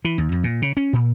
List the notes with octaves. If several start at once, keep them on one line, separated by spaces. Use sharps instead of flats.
E3
D#2
F2
A#2
C#3
C#4
A#2